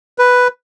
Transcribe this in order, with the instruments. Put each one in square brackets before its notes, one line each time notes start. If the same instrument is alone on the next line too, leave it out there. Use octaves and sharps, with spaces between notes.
[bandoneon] B4